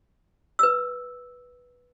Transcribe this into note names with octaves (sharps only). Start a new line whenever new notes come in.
B4 E6